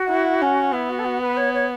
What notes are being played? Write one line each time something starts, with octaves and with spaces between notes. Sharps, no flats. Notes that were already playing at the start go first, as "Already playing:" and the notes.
Already playing: F#4
E4
C#4
B3 E4
F#4
A4
F#4
B4
C#5
C#5